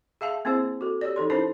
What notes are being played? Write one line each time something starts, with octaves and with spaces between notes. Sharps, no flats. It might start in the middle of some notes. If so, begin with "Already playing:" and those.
G#4 E5 F5 A5
A#3 C4 E4 G#4 C5
F#4 A4
G4 C#5 D5
E3 D#4 A4 C6
C#4 D#4 E4 A#4 C5 A5